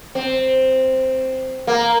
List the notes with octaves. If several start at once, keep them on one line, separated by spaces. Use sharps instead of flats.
C4
A#3